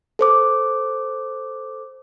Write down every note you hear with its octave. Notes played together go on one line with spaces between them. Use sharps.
A4 C5 D6